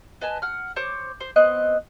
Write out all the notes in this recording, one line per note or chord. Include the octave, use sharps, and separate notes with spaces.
B4 D#5 G#5 A5
F#5 F6
C5 C#5 D6
C5
B3 C4 D#5 F#6